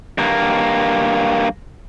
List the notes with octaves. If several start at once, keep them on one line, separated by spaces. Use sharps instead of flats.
G2 A#3